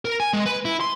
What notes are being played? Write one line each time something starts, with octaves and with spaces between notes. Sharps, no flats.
A#4
G#5
G#3
B4
E4
C6